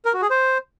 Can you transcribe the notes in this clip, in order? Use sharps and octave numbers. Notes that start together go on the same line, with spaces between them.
A#4
F#4
G#4
C5